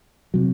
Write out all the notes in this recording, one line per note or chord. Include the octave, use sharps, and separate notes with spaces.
C3 F#3